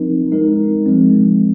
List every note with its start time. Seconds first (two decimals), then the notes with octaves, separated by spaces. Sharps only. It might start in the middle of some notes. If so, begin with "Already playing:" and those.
Already playing: F3 C4 D#4 A#4
0.32 G#3 D#4 A#4
0.86 F3 G#3 C4